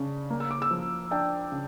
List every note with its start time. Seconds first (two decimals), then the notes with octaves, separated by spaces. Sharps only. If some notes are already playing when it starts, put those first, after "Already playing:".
Already playing: C#3 D4 C#6
0.30 A#3
0.40 E6
0.51 D6
0.62 E6
0.71 F3
1.11 D4 G5
1.52 C#3